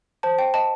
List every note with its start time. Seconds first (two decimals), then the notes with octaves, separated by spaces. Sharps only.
0.23 C5 A5
0.39 G5
0.54 D#5 A5